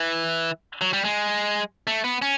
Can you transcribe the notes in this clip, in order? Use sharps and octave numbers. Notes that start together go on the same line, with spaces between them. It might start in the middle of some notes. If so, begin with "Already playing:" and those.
Already playing: E3
F#3
G3
G#3
A3
B3
C#4